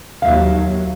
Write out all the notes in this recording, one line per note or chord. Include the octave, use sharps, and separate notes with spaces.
D#2 F#3 E5 F5